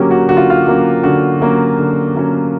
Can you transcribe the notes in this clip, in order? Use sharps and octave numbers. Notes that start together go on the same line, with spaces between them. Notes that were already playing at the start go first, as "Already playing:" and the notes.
Already playing: D3 F#3 A#3 C#4 G4
F#4
D3 F#4
F4
F4
F#3 A#3 C#4
D3 F#4
F#3 A#3 C#4
D3
F#3 A#3 C#4